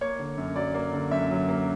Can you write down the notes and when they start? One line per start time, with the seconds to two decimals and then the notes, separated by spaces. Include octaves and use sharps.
0.01 A#3 C#5
0.19 D3
0.38 F#2
0.56 F#3 D5
0.74 A#3
0.93 D3
1.11 F#2 E5
1.30 F#3
1.49 A#3